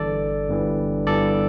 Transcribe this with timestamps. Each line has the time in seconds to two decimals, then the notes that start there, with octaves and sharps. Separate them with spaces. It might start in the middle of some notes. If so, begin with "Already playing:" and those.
Already playing: G1 G2 E3 A4 D5
0.48 G1 G2 E3
1.07 G1 G2 E3 A4 D5